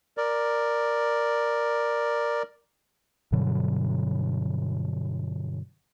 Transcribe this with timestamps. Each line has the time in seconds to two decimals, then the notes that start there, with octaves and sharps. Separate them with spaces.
0.17 A#4 D5
3.32 G2 B2 D3 F#3